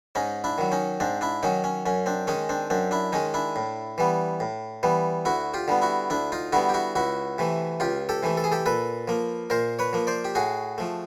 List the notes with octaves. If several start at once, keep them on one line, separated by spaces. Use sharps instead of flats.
G#2 C#4 D#4
D4 E4
D#3 F#3
C#4 D#4
G#2 C4 D4
D4 E4
D#3 F#3 C#4 D#4
C#4
F#2 C#4
C4 D4
D#3 G#3 C#4 D#4
C4 D4
F#2 C4 D4
D4 E4
D#3 G#3 C#4 D#4
D4 E4
A2
E3 G3 B3
A2
E3 G3 B3
D2 E4 F#4
F4 G4
D3 G3 B3
E4 F#4
D2 D4 E4
D#4 F4
D3 G3 B3 E4 F#4
G4
E4 F#4
C#2 E4 F#4
C3 E3 A3
C#2 F4 G4
G4 A4
C3 E3 A3
A4
G#4
G4 A4
A#2 A4 B4
F3 A#3
A#2 A#4 C5
B4 C#5
F3 A#3
C5 D5
G4
A2 F#4 G#4
F3 A3